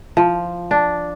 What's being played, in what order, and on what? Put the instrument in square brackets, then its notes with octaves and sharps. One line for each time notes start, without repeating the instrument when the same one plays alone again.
[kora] F3
D4